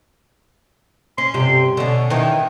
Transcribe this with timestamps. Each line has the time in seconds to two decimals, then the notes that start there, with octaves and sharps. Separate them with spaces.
1.18 C#4 C6
1.34 G2 C3 G4
1.77 B2 D3 C#4
2.10 D#3 E3 G5